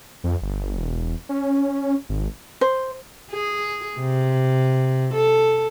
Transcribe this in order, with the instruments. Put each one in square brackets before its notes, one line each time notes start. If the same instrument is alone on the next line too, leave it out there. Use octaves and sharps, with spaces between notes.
[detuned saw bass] F2
G1
E1
C#4
G#1
[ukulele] C5
[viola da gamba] G#4
C3
A4